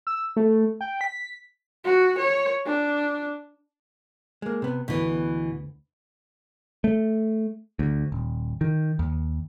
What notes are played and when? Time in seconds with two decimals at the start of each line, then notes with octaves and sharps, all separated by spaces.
0.07 E6
0.36 A3
0.81 G5
1.01 B6
1.84 F#4
2.18 C#5
2.65 D4
4.42 G#3 A#3
4.62 C3 B3
4.88 D2 B2 E3 B4
6.84 A3
7.79 D2
8.12 D#1
8.61 D#3
8.99 D#2